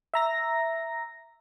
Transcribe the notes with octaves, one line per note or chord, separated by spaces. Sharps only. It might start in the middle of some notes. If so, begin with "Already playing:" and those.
E5 A#5 A#6